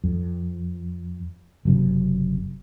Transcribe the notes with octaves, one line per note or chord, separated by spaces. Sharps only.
F2
F#1 F#2 C3